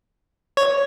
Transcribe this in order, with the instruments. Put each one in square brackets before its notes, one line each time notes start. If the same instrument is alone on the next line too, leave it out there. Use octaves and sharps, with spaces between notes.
[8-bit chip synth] C#5